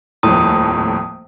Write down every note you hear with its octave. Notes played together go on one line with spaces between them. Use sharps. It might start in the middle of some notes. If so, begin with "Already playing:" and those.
D#1 F2 A2 D#6